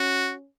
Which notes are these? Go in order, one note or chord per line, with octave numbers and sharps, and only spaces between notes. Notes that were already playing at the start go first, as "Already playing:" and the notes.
Already playing: C#4 F#4